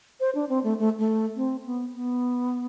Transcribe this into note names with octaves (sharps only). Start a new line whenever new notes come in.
C5
D4
C4
A3
A3
A3
C4
B3
B3